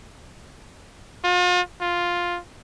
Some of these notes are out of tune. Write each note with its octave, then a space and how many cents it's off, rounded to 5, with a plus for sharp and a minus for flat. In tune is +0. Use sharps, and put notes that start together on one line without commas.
F4 +40
F4 +5